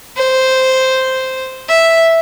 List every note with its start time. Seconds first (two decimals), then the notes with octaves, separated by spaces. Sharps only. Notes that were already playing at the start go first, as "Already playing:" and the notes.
0.17 C5
1.69 E5